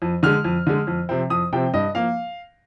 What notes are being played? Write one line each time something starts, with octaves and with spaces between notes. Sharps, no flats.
F2
D3 G#3 F6
F2
D3 G#3
F2
C3 F3 C4
F2 D#6
C3 F3 C4 G5
G2 D#5
F3 A#3 F5